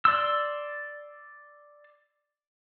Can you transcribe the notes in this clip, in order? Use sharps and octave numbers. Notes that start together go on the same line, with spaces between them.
D5 C6 E6